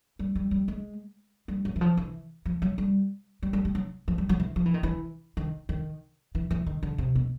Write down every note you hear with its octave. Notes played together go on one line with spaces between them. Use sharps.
G3
G3
G3
G#3
G3
F#3
E3
F3
E3
F3
F#3
G3
G3
G3
G3
F#3
F3
G3
F#3
E3
F3
E3
D#3
E3
D#3
D#3
E3
E3
D#3
D3
C3
B2